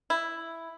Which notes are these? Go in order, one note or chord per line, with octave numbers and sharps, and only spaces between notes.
E4